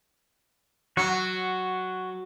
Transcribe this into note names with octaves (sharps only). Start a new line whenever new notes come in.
F#3 F#4 F#5 C#6